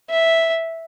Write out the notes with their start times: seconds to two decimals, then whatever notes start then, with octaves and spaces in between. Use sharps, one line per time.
0.10 E5